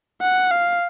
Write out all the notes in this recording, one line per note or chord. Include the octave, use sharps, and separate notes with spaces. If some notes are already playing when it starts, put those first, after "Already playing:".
F#5
F5